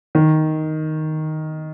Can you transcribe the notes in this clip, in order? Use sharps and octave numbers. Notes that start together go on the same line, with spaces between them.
D#3